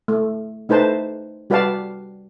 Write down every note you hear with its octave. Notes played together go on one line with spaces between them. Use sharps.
A3
A3 D#4 B4 C5 A5
G3 F#4 B4 D5 F5 A5